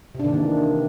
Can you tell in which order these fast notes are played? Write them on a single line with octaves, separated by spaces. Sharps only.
C3 D4 D#3 A#3 E3